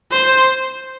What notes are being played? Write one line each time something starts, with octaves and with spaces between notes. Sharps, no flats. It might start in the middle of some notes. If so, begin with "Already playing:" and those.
C5